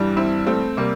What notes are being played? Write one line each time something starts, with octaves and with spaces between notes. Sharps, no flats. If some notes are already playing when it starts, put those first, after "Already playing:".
Already playing: G2 E3 G3
C4 E4
A3 C4
C3 G3 A#3